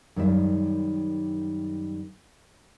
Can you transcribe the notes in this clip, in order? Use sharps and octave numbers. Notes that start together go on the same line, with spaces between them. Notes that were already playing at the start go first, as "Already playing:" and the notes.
F#2 D#3 G3 E5